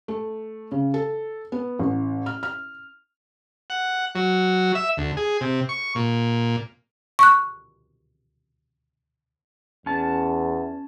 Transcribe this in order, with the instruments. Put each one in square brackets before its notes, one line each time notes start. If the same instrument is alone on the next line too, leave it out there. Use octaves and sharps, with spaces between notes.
[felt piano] A3
C#3
A4
B3
A1
F6
F6
[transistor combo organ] F#5
F#3
E5
D2
G#4
C3
C#6
A#2
[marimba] C#6 F#6
[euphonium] E2 [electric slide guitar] C#4 A5